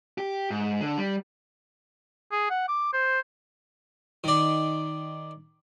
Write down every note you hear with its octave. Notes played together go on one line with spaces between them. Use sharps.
G4
G#2
D3
G3
G#4
F#5
D6
C5
D#3 D5